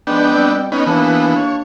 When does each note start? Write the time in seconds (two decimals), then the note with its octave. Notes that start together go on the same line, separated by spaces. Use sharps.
0.07 G#2 F3 G#3 B3 D4 G5
0.33 B2 G3 C4
0.72 B3 C#4 D#4
0.86 D#2 E3 A#3 B3 D4
1.36 C#5